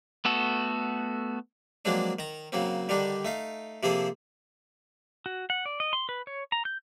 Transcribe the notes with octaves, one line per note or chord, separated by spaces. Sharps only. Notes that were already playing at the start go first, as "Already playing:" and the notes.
A3 B3 F#4 A4
F3 F#3 G#3 A#3 C4 D4
D#3 A#5
C#3 F#3 A#3 C4
D3 D#3 G3 D4 D#4
A3 D#4 F5
C3 F3 A#3 G#4 A4 C5
F#4
F#5
D5
D#5
C6
B4
C#5
A#5
G6